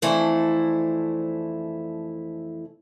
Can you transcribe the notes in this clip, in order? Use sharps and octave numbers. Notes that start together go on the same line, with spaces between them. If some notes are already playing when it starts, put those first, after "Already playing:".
F2 E3 A3 D4 E4 C5